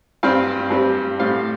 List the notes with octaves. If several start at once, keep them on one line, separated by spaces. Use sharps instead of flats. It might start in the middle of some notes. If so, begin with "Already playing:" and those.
G2 G3 C4 F5
G2 G3 C4
A2 G3 C4 F5